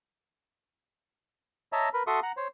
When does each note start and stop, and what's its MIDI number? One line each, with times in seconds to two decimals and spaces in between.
1.73 1.89 73
1.73 1.89 75
1.73 1.89 76
1.73 1.89 81
1.73 1.89 82
1.94 2.03 70
1.94 2.03 71
1.94 2.03 83
2.07 2.20 66
2.07 2.20 69
2.07 2.20 76
2.07 2.20 84
2.07 2.20 85
2.07 2.20 87
2.23 2.32 78
2.23 2.32 82
2.37 2.48 72
2.37 2.48 73